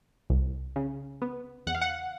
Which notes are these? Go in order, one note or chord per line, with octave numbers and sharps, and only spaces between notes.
C2
C#3
B3
E2 F#5
F5
F#5